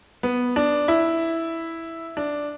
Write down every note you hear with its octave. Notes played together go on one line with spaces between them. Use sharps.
B3
D4
E4
D4